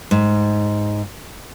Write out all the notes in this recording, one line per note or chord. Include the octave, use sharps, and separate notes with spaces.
G#2